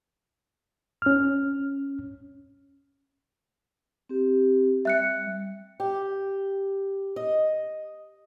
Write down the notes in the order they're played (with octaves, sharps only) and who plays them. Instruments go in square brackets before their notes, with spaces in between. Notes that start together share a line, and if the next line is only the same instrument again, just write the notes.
[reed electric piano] C#4 F6
[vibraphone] C4 G4
[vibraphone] G3 [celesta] E5 F#6 C#7
[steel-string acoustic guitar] G4
D#5